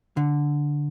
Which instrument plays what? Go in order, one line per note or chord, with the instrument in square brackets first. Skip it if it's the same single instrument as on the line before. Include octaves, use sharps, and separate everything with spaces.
[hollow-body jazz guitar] D3